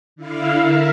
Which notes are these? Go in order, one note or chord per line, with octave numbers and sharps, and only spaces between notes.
D3 E4 F5
A#4 E5